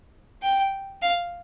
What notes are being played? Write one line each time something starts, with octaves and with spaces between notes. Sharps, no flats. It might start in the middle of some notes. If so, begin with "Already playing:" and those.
G5
F5